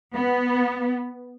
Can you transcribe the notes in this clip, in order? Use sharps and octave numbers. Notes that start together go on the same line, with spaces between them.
B3